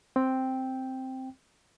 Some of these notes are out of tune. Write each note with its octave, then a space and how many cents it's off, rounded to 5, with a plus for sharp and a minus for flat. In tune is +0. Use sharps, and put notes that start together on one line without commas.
C4 +0 G5 +0